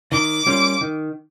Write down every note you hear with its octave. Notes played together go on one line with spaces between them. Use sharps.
D#3 D6
G3 A#3 C#4 F4
D#3